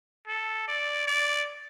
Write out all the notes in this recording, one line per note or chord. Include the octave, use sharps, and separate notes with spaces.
A4
D5
D5